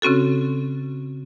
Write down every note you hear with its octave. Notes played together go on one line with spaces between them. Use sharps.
C#3 C4 C#4 F#4 A4